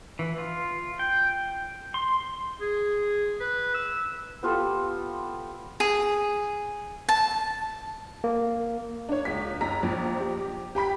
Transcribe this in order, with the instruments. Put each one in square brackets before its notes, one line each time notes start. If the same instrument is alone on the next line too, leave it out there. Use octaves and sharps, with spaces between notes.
[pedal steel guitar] E3
F4
G5
C6
[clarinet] G#4
B4
E6
[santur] B3 F4 G4 A4
[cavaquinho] G#4
A5
[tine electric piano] A#3
[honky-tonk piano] D4 C#5
C#2 B6
F#1 A#5 B6
A#1 F3
G4
G4 G5 B5 B6